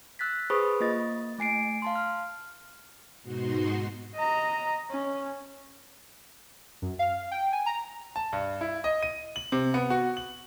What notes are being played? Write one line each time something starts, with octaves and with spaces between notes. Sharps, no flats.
E6 F#6 A6 B6
G#4 B4 C5 B5 C#6 D#6
A#3 F4 D#5 A6
A3 G#5 C7 D7
F5 A5 C6
F6
G#2 B2 D#4 F#4 C6
D#5 A#5
C#4
F#2
F5
G5
G#5
A#5
A5
G2
E4
D#5
D#7
F#7
C3
B3
F#4
F#7